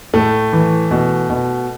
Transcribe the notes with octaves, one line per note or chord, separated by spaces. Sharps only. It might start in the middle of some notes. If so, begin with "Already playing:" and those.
A2 A3
E3
B2
B2